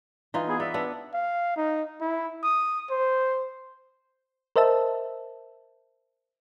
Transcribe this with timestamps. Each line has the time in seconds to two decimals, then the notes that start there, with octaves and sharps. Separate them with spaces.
0.34 E3 D#4 F4
0.48 B3 E4 G#4
0.60 B3 D5 E5
0.74 B3 D4
1.14 F5
1.57 D#4
2.01 E4
2.43 D#6
2.90 C5
4.56 A#4 C5 D#5 E5 A5 E6